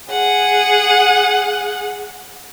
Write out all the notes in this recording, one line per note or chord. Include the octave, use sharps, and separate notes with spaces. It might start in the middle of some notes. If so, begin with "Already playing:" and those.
G#4 F#5